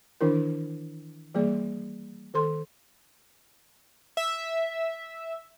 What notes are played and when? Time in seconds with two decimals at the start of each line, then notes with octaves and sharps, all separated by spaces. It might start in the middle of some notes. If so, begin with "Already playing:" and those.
0.21 D#3 E3 D4 E4 A#4
1.34 E3 G3 A#3 G#4 D5
2.34 D#3 A4 C6
4.17 E5